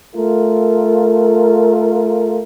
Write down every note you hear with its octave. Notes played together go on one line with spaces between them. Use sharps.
A3 F4 A#4